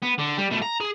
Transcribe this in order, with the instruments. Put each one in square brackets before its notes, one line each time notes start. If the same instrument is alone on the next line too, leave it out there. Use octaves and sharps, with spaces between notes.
[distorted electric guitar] B3
D3
G3
B2 A3
A#5
G#4